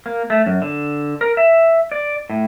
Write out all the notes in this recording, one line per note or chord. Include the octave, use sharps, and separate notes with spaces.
A#3
A3
F#2
D3
A#4
E5
D5
A2